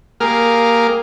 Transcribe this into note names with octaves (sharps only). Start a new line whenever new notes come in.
A#3 G4 G#4 A#4 F5